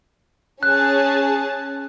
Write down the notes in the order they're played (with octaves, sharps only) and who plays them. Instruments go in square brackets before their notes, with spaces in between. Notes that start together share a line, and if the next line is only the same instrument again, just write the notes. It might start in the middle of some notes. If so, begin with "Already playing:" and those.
[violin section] C#4 G#4 A5 [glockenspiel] F#6